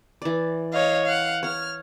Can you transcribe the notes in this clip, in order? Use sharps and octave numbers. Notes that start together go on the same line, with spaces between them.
E3 D5
C#5 D#5 F5
F5 F#5
C#5 F#5 F6